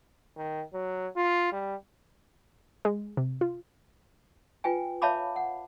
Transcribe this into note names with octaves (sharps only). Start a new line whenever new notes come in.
D#3
F#3
F4
G3
G#3
C3
F4
F4 B4 G5 G#5
C#5 E5 F5 A5 B5 D6
F#5